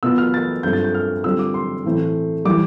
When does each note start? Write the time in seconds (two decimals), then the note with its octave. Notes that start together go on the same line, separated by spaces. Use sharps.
0.03 B2 B3 F4 E6
0.18 F6
0.34 A6
0.63 G2 F3 A3 C4 G6
0.73 A6
0.84 G6
0.95 F6
1.24 D3 G3 C4 F4 E6
1.39 D6
1.54 C6
1.84 A2 E3 A3 C4
2.45 E3 G3 D6